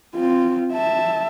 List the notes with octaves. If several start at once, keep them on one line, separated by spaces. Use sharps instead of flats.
C4 F4
E5 A5